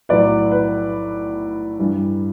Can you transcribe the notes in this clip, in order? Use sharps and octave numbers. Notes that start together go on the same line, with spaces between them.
B1 A2 F#3 B4 D5
B4
G2 E3 G3